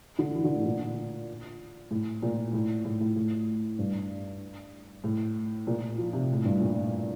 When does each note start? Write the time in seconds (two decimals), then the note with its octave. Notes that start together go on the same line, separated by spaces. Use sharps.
0.19 D3
0.35 E3
0.44 D3
0.55 A2
0.65 A#2
1.91 A2
2.23 A#2
2.53 A2
2.85 A2
3.00 A2
3.16 A2
3.79 G2
5.04 A2
5.67 A#2
5.98 F3
6.13 C3
6.33 A2
6.45 G2
6.60 A#2